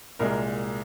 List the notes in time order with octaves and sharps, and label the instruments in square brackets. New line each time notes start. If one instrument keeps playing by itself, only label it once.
[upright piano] C2 A#2 G#3 A#4